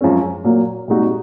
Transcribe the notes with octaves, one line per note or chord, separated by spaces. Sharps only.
F#2 F3 G#3 C#4
A#2 F#3 A#3
C2 A#2 G#3 D#4 F#4